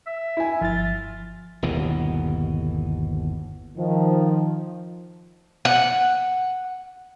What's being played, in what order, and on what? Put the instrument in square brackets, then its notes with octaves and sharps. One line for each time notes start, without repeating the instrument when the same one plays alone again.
[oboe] E5
[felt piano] E4 G#5
[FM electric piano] G1 A6 [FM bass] F3 [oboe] F4
[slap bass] G1 D#2 B2 E3
[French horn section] D#3 F3
[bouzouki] F#5